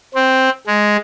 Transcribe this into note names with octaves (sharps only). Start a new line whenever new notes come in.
C4
G#3